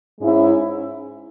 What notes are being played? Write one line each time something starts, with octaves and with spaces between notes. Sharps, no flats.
G#2 G#3 C#4 E4